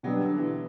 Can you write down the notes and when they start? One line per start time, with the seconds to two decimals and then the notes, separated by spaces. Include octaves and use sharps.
0.03 B2 F#3 G3 B3 D4
0.21 D3
0.38 E3